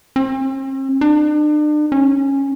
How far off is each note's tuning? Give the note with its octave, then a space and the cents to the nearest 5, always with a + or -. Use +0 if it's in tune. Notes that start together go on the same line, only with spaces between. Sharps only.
C4 +45
D4 +40
C#4 -10